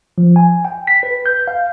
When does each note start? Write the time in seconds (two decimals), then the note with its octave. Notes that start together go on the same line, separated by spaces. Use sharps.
0.18 F3
0.36 G#5
0.65 G5
0.87 B6
1.03 B4
1.26 G6
1.48 F5